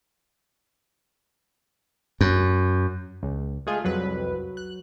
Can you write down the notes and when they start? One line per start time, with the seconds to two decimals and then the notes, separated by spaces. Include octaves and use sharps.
2.21 F#2
3.23 C#2
3.67 G#3 A3 F4 G#4
3.85 C2 F2 F#3 B4
4.57 F#6